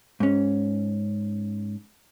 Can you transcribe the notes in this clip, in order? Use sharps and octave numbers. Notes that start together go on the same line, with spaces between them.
G#2 C#4